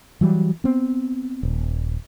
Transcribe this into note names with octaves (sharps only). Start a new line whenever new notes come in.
E3 F#3 G3
B3 C4
D#1